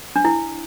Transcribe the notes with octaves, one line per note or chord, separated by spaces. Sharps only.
D4
E4